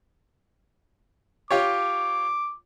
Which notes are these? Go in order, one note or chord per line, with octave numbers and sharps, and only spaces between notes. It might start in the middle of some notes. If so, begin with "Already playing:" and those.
F4 G4 C#5 D6